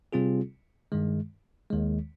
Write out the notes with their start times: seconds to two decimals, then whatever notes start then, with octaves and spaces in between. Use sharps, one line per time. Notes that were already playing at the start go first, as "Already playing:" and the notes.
0.13 C3 G3 C4 F4 G#4
0.92 G2 D#3 G#3
1.70 D#2 D#3 G#3